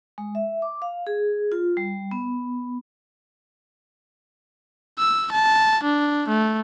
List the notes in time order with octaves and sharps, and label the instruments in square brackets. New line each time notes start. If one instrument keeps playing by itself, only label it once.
[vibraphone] G#3
E5
D6
F5
G#4
F4
G3
B3
[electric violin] E6
A5
D4
A3